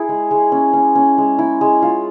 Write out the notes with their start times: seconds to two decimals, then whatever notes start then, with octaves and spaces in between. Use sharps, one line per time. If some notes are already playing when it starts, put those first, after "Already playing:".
Already playing: E4 G#4
0.09 G#3
0.31 G#3
0.52 C#4
0.73 C#4
0.95 C#4
1.18 G#3
1.39 E4
1.61 G#3
1.82 F4